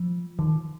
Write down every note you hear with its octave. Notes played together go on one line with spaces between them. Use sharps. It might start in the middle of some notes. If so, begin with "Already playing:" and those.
Already playing: F3
D#3